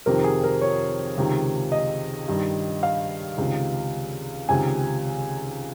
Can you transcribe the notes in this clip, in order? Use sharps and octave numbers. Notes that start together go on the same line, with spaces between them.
F2 C3 D#3 A#4
G#4
A#4
C#5
C#2 C3 D#3
D#5
G2 D#3
F5
C#2 C3 D#3
C#2 C3 D#3 G#5